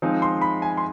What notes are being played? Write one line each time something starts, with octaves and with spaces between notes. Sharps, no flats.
F3 G#3 C4 D#4
C6
B5
G#5
C6